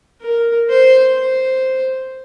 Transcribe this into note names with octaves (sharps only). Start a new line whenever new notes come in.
A#4
C5
C5